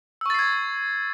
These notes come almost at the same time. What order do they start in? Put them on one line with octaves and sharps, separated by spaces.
E6 C#6 A6 C7 G#6